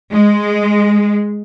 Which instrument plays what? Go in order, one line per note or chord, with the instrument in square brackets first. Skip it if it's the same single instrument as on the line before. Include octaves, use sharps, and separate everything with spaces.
[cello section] G#3